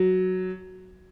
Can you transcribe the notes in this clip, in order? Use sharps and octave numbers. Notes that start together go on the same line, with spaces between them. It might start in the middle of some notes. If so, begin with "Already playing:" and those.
Already playing: F#3